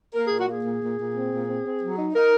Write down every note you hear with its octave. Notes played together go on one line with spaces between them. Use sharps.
A#3 A#4
G#4
A#2
F#4
A#3 G#4
A#2
A#2
A#2
C4
A#2
C4
C4
F#3
D#4
D#4 A#4